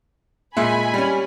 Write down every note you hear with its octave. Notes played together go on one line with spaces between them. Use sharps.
A#2 G#3 E5 G#5 B5
G3 C#4